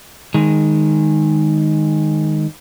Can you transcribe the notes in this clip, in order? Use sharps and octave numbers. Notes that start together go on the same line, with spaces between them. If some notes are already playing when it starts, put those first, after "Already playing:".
D#3 G#3